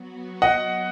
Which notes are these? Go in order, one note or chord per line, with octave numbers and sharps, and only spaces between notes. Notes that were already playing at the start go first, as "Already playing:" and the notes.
Already playing: F#3 B3 F#4
D#5 F#5